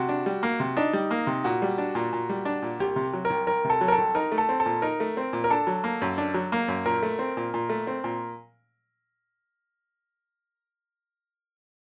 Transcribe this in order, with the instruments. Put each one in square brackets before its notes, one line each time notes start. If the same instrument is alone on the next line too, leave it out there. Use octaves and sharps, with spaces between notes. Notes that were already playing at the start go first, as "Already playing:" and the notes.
Already playing: [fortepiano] C3 [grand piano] F#4
[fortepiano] D4
G3
A#3
C3
[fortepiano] D4 [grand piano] D#4
[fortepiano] G3
A#3
C3
[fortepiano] A#2 [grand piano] F#4
[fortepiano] G3
D4
A#2
A#2
G3
D4
A#2
[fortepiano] C2 [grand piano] G4
[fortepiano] C3
F#3
[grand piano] A#4
[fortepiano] C2
[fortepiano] C2 [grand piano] A#4
[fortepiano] C3
[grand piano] A4
[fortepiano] F#3
[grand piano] A#4
A4
[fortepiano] C2
[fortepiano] D#4 [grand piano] A#4
[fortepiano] A3
[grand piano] A4
[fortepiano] C4
[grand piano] A4
[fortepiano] A#2
[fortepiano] D#4 [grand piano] A#4
[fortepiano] A3
C4
A#2
[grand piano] A#4
[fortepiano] D4 [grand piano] A4
[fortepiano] F#3
A#3
F#2
D4
F#3
A#3
F#2
[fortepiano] A#2 [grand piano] A#4
[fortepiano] A3
C4
A#2
A#2
A3
C4
A#2